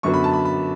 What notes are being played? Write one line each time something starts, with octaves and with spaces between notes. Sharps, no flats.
F#2 D3 F#3 B3 C#6
B5
A5
B5
B5